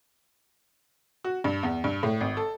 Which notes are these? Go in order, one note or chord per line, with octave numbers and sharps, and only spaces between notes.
F#4
G2
E2
G2
A2
G#1
A4